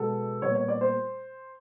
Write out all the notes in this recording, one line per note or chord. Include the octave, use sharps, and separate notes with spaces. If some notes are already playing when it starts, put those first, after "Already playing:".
Already playing: B2 G#3 B3 A4
A#2 G3 B3 C#5
C#5
D5
C5